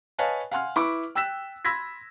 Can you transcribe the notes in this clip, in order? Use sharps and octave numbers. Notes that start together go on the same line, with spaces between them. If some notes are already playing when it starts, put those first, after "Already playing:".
B4 C#5 D#5 F5 G#5 A5
F5 F#5 G#5 C6 F6
E4 B4 B5 C#6 D6
G5 E6 F#6 B6 E7
B5 C6 E6 G#6 A#6 B6